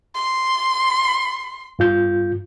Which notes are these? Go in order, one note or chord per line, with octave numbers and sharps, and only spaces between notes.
C6
G2 F4 G6